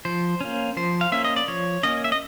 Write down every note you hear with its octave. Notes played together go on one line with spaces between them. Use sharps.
F3 C5
A#3 C#4
F3 C5
F5
A#3 C#4 E5
D#5
D5
F3 C#5
A#3 C#4 D#5
E5
D#5